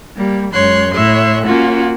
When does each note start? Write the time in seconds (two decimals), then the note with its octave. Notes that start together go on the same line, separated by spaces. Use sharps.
0.17 G3 A#3
0.54 F#2 G#3 C#5 C6 F#6
0.93 A2 C#5 E5 C6 F#6
1.44 A#3 C#4 F4 F#4